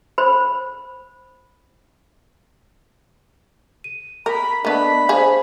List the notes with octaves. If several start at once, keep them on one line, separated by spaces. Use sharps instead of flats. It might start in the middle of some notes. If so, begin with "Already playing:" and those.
C5 B5
D#7
A#4 B5
A3 B3 D4 A#4 D#5 A5 B5
G#4 C5 F5 G#5